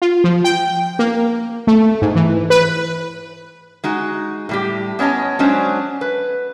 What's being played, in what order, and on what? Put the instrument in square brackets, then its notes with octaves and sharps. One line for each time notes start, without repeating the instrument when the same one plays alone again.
[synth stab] F4
F3
G5
A#3
A3
G#2
E3
B4
[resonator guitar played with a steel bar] G#3 D#4 F#4
A2 G3 G4
B3 C#4 C#5 D#5 A5
F#3 G#3 C#4 D4 C5
B4